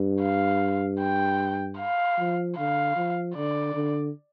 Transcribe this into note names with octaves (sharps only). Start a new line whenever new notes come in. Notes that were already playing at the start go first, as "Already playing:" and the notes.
Already playing: G2
F5
G5
F5
F3
D3 F5
F3
D3 D5
D3